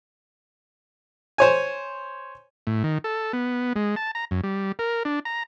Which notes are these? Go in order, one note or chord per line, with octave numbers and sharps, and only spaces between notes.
C5 C#5 G#5
A2
D#3
A4
B3
G#3
A5
A#5
F#2
G3
A#4
D4
A#5